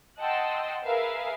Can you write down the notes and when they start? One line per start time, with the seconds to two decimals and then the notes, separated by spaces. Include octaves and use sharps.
0.19 D#5 F#5 G5 A5 C6 E6
0.84 G#4 A#4 B4 E5 F5